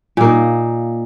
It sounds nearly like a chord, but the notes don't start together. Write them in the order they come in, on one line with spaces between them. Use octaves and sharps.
A#2 A#3 D#4